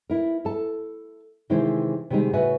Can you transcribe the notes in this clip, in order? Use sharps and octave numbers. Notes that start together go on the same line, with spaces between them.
E4 A#4
A4 A5
C3 D#3 E3 G#3 E4 C5
C3 D#3 G3 G#3 D#4
A2 C#3 F#4 B4 E5 G#5